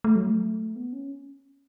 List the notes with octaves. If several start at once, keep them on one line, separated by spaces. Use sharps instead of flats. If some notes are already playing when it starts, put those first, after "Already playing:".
A3
F#3
A3
B3
C#4